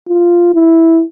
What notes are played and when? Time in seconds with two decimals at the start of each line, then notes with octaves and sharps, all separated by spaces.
0.09 F4
0.54 E4